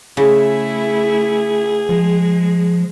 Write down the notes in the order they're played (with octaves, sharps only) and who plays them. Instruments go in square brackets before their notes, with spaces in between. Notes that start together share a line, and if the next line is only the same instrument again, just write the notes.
[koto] C#3 [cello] A3 E4 [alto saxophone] G#4
[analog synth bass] F3 [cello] G#3